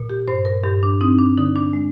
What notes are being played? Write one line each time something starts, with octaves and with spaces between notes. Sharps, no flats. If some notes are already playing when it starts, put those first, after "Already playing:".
Already playing: A#2
G4
G2 C5
A#4
G2 G4
D4
C4 D#4
D4
D3 D#4
D4
G#3